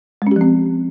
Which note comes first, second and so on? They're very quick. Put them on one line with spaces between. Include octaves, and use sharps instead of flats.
G#3 C#4 G4 F3 C4